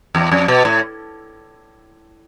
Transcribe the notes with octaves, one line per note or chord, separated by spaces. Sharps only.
E2
F2
B2
A2